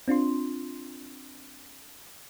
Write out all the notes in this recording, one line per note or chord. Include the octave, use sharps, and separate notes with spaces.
C4 D4 F4 C6